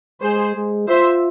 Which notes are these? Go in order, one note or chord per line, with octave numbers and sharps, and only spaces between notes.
G#3 G#4 C5
G#3
F4 C5 E5